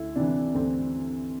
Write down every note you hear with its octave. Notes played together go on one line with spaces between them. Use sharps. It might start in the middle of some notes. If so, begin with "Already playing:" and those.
Already playing: D2 E4
C3 E3 D4
D2 C4